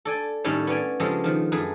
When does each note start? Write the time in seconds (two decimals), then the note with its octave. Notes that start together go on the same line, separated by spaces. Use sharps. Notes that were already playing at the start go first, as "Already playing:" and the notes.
0.05 A4 D5 G#5
0.44 A2 D#3 G3 C#4 E4 G4
0.67 B3 C#4 D5 G#5
1.00 C#3 F3 G#3 G4 A4
1.24 D#3 F3
1.52 F#2 A3 G#4 B4